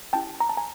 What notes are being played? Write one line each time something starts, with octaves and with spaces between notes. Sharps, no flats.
C#4 E4 G4 G5 A5
A#5
A5
G#5 A#5